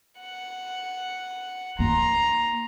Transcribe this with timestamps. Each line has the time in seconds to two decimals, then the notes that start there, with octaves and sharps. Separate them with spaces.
0.20 F#5
1.79 A#3 D#4 A#5 C6